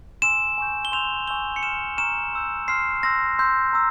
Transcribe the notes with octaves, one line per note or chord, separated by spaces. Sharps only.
G#5 C6 E6 E7
G#5 C#6 G6
G7
C6 E6 G6 F7
G#5 C#6 E6 G6 G7
C#7
C6 F6 E7
A#5 C#6 F6 E7
C6 E6 G6
C6 F6 C7
C6 E6 G6 A#6
C6 E6 G6
A#5 E6